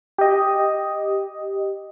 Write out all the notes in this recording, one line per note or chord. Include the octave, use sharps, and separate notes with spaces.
G4 D#5